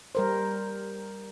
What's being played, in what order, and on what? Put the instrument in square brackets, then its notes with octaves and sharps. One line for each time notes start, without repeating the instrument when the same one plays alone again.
[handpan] G3 A#4 C5